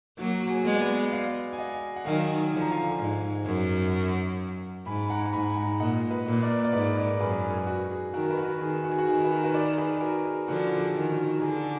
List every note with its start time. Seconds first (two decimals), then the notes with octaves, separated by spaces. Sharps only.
0.18 F#3 A#3 F#4
0.50 G#4
0.65 G#3 B3
0.76 D5
0.81 B4 D#5
1.12 D5 F5
1.53 G#5
1.58 D#5 F#5
1.96 F#5
2.05 D#3 F#3 F5 G#5
2.52 D3 F3 G#5
2.62 A#5
2.72 F5 G#5
2.99 G#2
3.46 F#2
4.86 G#2 G#5 B5
5.10 F#5 A#5
5.25 A#5
5.33 G#2 G#5 B5
5.57 F#5 A#5
5.80 A#2 D#5 F#5
6.11 B4 D#5
6.27 A#2
6.42 A#4 D5
6.65 D5
6.73 G#2 B4 D#5
6.93 D#5
6.97 A#4 D5
7.20 F#2 G#4 B4
7.44 G#4
7.67 F#4
7.91 G#4
8.13 D#3 F#4 A#4
8.30 B4
8.37 F#4 A#4
8.61 D#3 G#4
8.84 F#4
8.91 G#4
8.98 F#4
9.08 D#3 G#4
9.25 B4
9.31 F#4 A#4
9.44 B4
9.54 A#4 D5
9.77 G#4 B4
10.01 F#4 A#4
10.25 G#4
10.48 D3 F3 F#4
10.79 G#4
10.95 D#3
11.10 F#4
11.38 A#4
11.41 D3 G#4